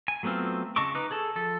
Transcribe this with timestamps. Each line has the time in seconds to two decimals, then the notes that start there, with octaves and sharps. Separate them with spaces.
0.08 G#5
0.23 F#3 A3 B3 C4 F4
0.76 C#3 D#5 A5 C#6 D6
0.95 D#4 B4 D6
1.11 G#4 A4 A5
1.36 F3 A4